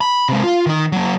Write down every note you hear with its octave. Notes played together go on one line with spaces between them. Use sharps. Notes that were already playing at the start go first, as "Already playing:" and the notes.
B5
C3 G#3
F4
D#3 D#4
F#3 A#3